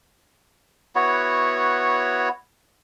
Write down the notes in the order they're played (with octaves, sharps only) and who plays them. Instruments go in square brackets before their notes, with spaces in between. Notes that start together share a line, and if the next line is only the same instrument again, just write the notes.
[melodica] B3 E4 F#4 C#5